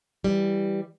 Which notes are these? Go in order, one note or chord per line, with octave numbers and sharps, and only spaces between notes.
E3 G3